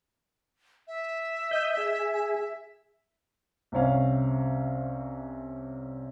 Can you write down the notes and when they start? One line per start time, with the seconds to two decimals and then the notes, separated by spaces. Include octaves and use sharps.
0.88 E5
1.51 D#5 G6
1.77 G#4
3.72 C2 C3 C#4 F5